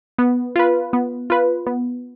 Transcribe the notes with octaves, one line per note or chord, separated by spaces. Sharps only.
B3
F4 B4
B3
F4 B4
B3